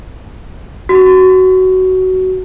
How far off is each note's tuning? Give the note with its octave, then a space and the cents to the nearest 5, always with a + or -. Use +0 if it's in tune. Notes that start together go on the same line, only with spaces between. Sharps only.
F#4 +15